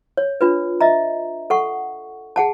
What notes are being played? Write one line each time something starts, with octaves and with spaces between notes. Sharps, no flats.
C#5
D4 F4 B4
D#5 E5 A#5
A4 F#5 C#6
G#4 F#5 A5